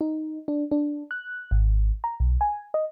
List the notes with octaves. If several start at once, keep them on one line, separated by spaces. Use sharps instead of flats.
D#4
D4
D4
F#6
G#1
A#5
B1
G#5
D#5